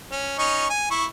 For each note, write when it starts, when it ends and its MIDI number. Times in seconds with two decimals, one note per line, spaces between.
0.12 0.37 61
0.39 0.67 61
0.39 0.67 63
0.39 0.67 85
0.70 0.86 80
0.91 1.05 64
0.91 1.05 85